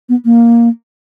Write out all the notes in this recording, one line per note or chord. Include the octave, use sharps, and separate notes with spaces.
B3
A#3